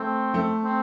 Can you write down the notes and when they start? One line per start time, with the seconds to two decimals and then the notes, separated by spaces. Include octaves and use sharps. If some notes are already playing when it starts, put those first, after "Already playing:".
Already playing: A3 C4
0.34 A3
0.64 C4